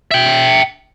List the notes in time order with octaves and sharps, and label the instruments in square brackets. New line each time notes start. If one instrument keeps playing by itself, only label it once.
[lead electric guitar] E5 G5